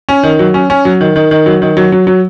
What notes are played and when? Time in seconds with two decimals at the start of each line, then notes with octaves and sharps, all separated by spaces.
0.09 C#4
0.23 D#3
0.39 F#3
0.54 C#4
0.70 C#4
0.85 F#3
1.01 D#3
1.16 D#3
1.31 D#3
1.46 F#3
1.62 D#3
1.77 F#3
1.92 F#3
2.07 F#3